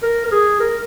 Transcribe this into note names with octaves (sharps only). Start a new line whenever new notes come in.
A#4
A#4
G#4
A#4